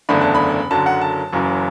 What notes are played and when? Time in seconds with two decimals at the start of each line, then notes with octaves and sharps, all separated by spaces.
0.09 F#1 E2 D3 A3 D4 B5
0.21 A5
0.35 B5
0.71 F#1 F#2 D3 A5
0.86 F#5
1.01 A5
1.33 F#1 F#2 E3